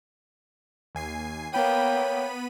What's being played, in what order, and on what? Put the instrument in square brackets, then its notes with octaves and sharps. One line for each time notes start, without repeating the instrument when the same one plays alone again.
[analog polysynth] D#2 G#5 C7
[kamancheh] A#3 G5 [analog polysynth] B3 B5 D#7 [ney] C#5